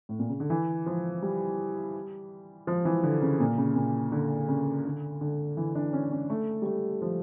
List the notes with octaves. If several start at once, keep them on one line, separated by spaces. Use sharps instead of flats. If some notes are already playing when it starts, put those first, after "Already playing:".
A2
A#2
C#3
D3
E3
F3
G3
F3
E3
D3
C#3
A#2
C#3
A#2
D3
C#3
D3
D3
E3
D4
C#4
C#4
A3
G3
A3
F3